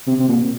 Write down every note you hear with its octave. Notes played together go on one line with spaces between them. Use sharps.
C3
C3
A#2